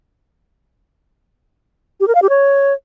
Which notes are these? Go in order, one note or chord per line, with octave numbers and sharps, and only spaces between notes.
G4
A#4
F5
G4
C#5